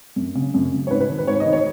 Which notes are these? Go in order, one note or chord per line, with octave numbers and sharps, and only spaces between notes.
F#2
C#3
F#2
C#3
C#5
G#2 B4
B4
D#3
B4
G#2 C#5
D#5
D#3
C#5